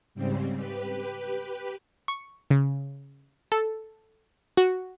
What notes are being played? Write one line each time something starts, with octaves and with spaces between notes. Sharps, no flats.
G#2 C#3 G3 C4
G4 B4
C#6
C#3
A4
F#4